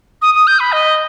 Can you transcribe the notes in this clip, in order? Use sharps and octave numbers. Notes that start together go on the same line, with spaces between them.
D#6
D#6
G6
B5
D#5